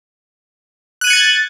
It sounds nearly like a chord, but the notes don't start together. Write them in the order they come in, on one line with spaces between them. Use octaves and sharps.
F#6 D#7 G#6 C#7 A6